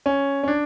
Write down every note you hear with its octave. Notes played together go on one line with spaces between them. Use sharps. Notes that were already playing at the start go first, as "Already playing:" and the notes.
C#4
C#4
D4